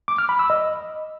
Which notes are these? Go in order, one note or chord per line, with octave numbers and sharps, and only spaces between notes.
D6
F6
B5
E6
D#5